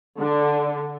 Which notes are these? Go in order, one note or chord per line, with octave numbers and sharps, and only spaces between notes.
D3